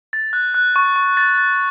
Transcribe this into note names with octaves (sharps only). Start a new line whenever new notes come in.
A6
F#6
F#6
C#6
C#6
A6
A6